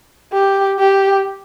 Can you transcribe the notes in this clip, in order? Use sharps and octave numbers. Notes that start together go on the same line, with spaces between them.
G4
G4